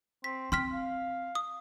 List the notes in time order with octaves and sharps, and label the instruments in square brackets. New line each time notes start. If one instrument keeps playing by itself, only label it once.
[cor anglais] C4 [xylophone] B6
[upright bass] C4 [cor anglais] G5 [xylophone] C6 F6 B6
[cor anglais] F5
[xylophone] D#6